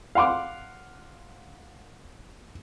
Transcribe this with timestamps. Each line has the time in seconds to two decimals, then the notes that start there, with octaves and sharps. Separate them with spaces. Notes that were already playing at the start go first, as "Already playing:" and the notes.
0.15 F5 F#5 C6 D6